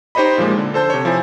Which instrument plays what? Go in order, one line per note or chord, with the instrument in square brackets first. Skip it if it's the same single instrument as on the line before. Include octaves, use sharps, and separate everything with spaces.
[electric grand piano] D#4 G4 C5 C#5 D#5 B5
A#2 F3 G#3 A#3
D3
A4 C5 A5 G6
C3 C#5
F3 E4 A4 G#5